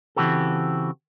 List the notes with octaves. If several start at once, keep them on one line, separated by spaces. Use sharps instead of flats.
C#3 E3 C4 F#4 G4 A4